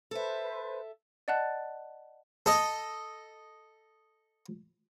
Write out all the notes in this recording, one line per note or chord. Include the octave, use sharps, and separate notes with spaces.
A4 B4 C5 E5
D5 D#5 F#5 A5 F#6 A6
A4 D#5